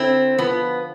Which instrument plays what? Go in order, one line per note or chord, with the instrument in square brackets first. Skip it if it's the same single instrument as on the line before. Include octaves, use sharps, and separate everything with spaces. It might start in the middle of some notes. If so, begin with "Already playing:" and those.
Already playing: [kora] D3 E4 [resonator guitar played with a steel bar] C4
[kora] F3 [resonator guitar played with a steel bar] B3